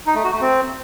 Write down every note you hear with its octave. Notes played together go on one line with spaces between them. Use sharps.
D#4
A3
F#4
A3
C4